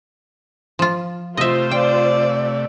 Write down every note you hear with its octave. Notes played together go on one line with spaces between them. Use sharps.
F3 F4
C3 A3 F4 C5 D#5 E5
D5 G5